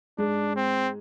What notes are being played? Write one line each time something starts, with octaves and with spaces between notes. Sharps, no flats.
G#2 G#3 D4
C4